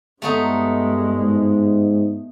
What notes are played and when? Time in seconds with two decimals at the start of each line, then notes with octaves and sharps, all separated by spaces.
0.22 G2 G#3 A3 B3 D#4
1.15 G#2